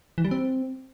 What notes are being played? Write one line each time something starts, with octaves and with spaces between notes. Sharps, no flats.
E3
G3
C4